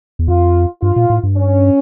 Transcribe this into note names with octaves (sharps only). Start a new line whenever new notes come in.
E2
F2 F4
G2 F4
A#2
A2
G2
C#4